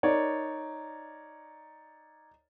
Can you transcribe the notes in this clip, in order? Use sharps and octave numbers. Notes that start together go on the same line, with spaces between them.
D#4 A#4 C#5 D5